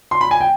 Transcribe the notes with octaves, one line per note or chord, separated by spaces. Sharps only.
C6
B5
G#5
G5